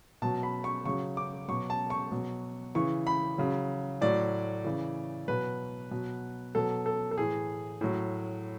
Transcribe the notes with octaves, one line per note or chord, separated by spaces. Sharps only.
B2 F#3 A5
B5
C#6
C#3 F#3 C#6
D6
B2 F#3 C#6
A5
C#6
B2 F#3
C#3 E3 C#6
B5
C#3 F#3
A2 F#3 D5
C#3 E3
B2 F#3 B4
B2 F#3
B2 F#3 A4
A4
A4
A2 E3 G#4
A2 F#3